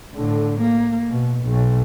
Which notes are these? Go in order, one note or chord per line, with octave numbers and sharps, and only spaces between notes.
A2 D3
A#3
B2
B1